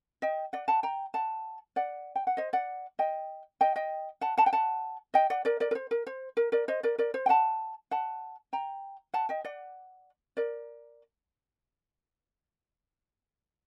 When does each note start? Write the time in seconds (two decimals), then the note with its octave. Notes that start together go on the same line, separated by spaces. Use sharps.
0.22 D#5 G5
0.53 D5 F#5
0.68 F#5 A5
0.83 G5 A#5
1.14 F#5 A5
1.76 D5 F#5
2.16 G5
2.27 F#5
2.37 C5 D#5
2.53 D5 F#5
2.99 D#5 G5
3.61 D#5 G5
3.76 D#5 G5
4.21 F#5 A5
4.38 F#5 A5
4.46 G5
4.53 F#5 A5
5.14 D#5 G5
5.30 D5 F#5
5.45 A#4 D5
5.60 A#4 D5
5.71 A#4
5.75 C5
5.91 A#4
6.07 C5
6.37 A#4
6.52 A#4 D5
6.68 C5 D#5
6.83 A#4 D5
6.98 A#4 D5
7.14 C5
7.26 G5
7.29 F#5 A5
7.91 F#5 A5
8.53 G5 A#5
9.14 F#5 A5
9.29 D#5 G5
9.44 D5 F#5
10.37 A#4 D5